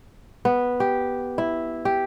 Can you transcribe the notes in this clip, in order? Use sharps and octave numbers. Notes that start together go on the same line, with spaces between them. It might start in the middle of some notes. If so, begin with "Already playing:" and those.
B3
G4
E4
G4